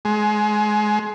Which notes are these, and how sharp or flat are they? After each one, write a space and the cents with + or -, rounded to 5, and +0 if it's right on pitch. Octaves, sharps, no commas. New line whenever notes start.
G#3 +25